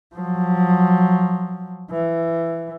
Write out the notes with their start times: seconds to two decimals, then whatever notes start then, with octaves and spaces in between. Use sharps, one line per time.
0.15 F3 F#3
1.91 E3